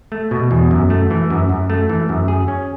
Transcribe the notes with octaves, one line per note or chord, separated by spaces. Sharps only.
A3
B2
E2
F#2
A3
E3
F#2
F#2
A3
E3
F#2
G#4
C#4